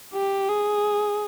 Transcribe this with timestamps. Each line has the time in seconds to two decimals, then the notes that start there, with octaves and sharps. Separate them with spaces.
0.14 G4
0.49 G#4